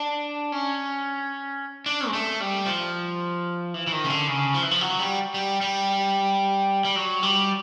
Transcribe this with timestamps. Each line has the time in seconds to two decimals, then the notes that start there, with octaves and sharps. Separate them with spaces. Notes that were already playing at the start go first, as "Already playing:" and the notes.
Already playing: D4
0.52 C#4
1.86 D4
2.07 G#3
2.13 A3
2.40 G3
2.66 F3
3.74 E3
3.87 E3
3.92 D#3
4.04 C#3
4.10 D3
4.28 C#3
4.54 F3
4.63 E3
4.71 F3
4.81 F#3
4.99 G3
5.34 G3
5.61 G3
6.85 G3
6.96 F#3
7.23 G3